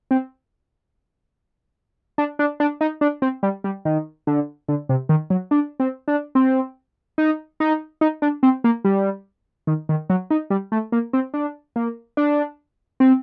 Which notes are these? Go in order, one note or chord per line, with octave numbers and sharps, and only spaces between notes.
C4
D4
D4
D4
D#4
D4
C4
G3
G3
D#3
D3
D3
C3
D#3
F#3
D4
C4
D4
C4
D#4
D#4
D#4
D4
C4
A#3
G3
D#3
D#3
F#3
D#4
G3
A3
A#3
C4
D4
A#3
D4
C4